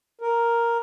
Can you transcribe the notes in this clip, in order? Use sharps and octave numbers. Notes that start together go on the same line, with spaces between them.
A#4